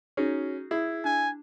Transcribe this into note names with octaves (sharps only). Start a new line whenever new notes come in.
C#4 D#4 F#4 G#4
E4 G#4
D4 G#5